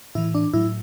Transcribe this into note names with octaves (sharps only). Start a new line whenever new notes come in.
A2 E3 E4
D4
A2 F#3 E4